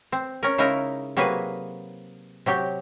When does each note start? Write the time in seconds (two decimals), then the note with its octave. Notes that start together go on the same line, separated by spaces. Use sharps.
0.12 C4
0.43 C#4 A#4
0.58 C#3 G#3 D#4 E4 A#4
1.17 C3 F#3 A#3 G#4 B4 G#5
2.46 C3 F#3 G4